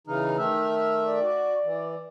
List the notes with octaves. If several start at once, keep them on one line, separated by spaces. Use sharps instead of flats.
C#3 E3 D#4 F6
D#3 A3 E5
D5
F#4
E3